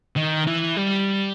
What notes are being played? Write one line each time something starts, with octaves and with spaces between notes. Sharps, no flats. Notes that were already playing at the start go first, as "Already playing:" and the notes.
D#3
E3
G3